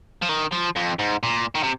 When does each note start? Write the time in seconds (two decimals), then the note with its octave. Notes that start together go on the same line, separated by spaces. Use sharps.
0.22 F3
0.29 D#3
0.52 F3
0.76 F2
0.99 G#2
1.23 A#2
1.55 D#3
1.63 C3